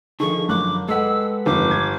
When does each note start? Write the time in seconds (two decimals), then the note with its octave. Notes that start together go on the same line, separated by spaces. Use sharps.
0.20 D3 D#3 F3 G#4 A4 C#6
0.49 F#1 D6 F#6
0.89 G#3 A4 B4 D#5 F#5 E6
1.46 G1 F2 D#3 D6
1.71 G#6